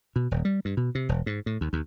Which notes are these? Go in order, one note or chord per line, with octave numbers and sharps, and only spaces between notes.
B2
D#1
G3
G2
B2
C3
E1
G#2
A2
D#2
D#2